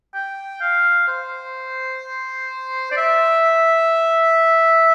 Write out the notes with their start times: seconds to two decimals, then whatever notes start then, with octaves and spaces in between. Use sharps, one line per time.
0.14 G5
0.61 F5
1.08 C5
2.91 D5
2.97 E5